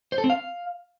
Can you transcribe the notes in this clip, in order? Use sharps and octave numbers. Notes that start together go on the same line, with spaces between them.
C5
A4
C4
F5